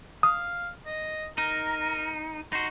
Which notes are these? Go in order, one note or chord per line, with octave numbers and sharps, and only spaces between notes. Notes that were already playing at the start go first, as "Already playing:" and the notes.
F5 D#6
D#5
D#4 A#4
D#4 F#4 C6